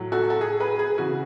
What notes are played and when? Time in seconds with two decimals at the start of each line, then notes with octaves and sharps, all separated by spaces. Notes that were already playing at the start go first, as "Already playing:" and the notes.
Already playing: A2 F#3
0.12 F#4 A4
0.30 A4
0.41 G#4
0.60 G#4 B4
0.79 G#4
0.98 C#3 E3 F#4